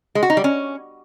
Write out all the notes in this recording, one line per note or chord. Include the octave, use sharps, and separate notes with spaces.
G#3
F#4
D#4
G3
C#4